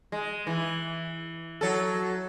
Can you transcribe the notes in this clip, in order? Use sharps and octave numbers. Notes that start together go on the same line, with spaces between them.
G#3
E3
F#3 A4